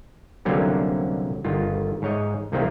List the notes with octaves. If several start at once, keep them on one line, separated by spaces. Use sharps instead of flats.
C2 D3 F#3 A#3 C#4 G4
G1 D#3 F4
G#2 C#5 D#5
C2 C3 D#3 A#3 C4 F4